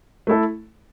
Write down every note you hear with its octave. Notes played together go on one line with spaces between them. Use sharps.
A3 E4 A4